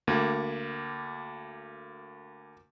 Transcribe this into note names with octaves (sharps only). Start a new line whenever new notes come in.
D2 A#3